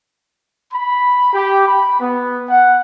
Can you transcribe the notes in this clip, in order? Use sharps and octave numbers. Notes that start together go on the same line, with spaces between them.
B5
G4
B5
B3
F#5